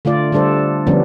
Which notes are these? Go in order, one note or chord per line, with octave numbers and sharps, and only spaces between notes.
D3 A3 F4 D5
D3 G3 D4 A4 C5
D3 F3 G3 B3 C#4 D4